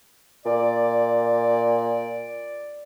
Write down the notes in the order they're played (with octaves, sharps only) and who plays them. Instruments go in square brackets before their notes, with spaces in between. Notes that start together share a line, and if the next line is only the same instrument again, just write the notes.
[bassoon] A#2 [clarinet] D5